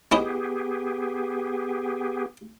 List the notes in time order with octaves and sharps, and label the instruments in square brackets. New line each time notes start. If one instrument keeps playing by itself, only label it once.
[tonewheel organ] B3 G4 G#4 [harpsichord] C#4 E4 D#5